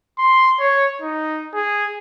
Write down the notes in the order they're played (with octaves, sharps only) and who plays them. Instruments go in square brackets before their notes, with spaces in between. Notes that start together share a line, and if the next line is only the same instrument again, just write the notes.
[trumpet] C6
C#5
D#4
G#4